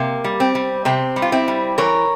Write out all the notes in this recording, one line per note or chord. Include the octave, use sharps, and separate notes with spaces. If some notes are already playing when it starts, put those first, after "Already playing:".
Already playing: C3 A#3
G3
C4
G3
C3 C4
G3
F4
C4 E4
G3
E3 A#4 C#5